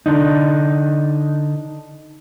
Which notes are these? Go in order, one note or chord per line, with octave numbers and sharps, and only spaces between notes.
D3 D4 D#4